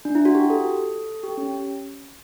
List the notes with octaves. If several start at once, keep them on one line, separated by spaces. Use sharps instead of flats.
D4
E4
F#4
G4
A4
G4
C#4